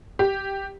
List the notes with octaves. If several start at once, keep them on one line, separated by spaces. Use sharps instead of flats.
G4